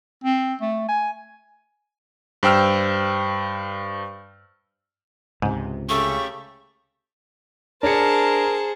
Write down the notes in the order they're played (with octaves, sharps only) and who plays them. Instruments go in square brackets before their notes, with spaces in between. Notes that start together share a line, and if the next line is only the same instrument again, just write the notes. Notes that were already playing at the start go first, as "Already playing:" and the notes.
[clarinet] C4
A3
G#5
[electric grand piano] G2 C5 G5 E6 F6
[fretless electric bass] C#2 C3 [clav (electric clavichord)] G#2
[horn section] C#3 A3 G4 [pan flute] C#6
[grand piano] D4 C#7 [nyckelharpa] G#4 C5 [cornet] A#4 [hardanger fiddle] A5